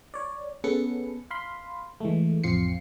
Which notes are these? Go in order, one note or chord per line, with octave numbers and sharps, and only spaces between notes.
C#5 D5
B3 C#4 G#4 A4 B4 C#7
F5 B5 C6
E3 G#3 A3
A1 F2 C4 F4 C7 C#7